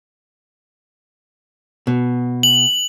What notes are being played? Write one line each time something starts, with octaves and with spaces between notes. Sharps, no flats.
B2
F#7